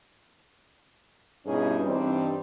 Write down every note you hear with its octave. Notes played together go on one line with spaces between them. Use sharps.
G2 B2 C#4 D#4 E4 G#4
G2 E3 G3 C4 D4 D#4